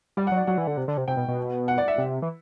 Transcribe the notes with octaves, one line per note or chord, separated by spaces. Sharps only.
G3 D5
F#5
F#3
D5
F#3 F#5
E3
D3
C3
D3
C3
C3 G5
B2
B2
F#5
D5
E5
C3
E3